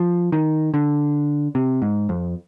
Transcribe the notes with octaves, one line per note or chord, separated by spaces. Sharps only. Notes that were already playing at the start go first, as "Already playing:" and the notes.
Already playing: F3
D#3
D3
C3
G#2
F2